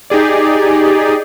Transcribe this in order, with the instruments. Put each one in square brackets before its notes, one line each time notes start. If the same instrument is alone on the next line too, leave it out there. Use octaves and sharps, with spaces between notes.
[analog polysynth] D#4 G4 G#4 D5